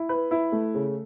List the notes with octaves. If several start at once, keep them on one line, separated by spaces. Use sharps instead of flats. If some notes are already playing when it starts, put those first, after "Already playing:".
Already playing: E4
B4
E4
A3
C#3